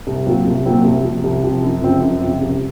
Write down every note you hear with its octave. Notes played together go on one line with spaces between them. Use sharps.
C2
A#2 F#3 C4 F4
C2
A#2 F#3 C4 F4
C2
C3 F3
C2
C3 F3
F#2
C#3 F3 C4 F4
F#2
C#3 F3 C4 F4
C2